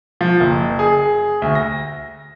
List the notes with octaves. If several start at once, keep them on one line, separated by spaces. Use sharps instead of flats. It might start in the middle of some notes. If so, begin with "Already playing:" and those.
F3
F#1
G#4
D2
A#6